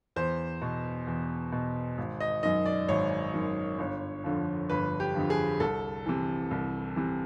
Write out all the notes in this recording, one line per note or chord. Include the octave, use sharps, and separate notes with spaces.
E2 C5
B2
E2
B2
G#1
D#5
F#2 D#3 D#5
D5
G#1 C#5
F#2 D#3
G1
F2 D3 F3
G1 B4
G4
F2 D3 F3
G#4
C2 A4
C3 E3
C2
C3 E3